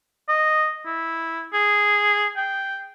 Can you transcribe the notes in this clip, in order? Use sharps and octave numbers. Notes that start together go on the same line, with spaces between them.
D#5
E4
G#4
G5